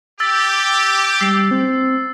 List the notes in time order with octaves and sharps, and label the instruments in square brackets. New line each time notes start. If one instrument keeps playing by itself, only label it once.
[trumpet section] G4 [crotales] E6 A6
[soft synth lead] G3 [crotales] E6 C7
[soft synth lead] C4